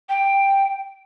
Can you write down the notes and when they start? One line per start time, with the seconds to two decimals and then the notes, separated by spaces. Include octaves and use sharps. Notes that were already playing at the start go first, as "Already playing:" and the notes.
0.09 G5